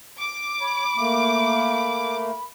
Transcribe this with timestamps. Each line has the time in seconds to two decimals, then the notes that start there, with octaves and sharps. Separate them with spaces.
0.18 D6
0.61 C#5 B5
0.97 A3 A#3